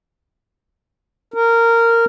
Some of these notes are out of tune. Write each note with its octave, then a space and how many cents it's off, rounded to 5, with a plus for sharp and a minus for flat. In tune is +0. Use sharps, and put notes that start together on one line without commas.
A#4 -15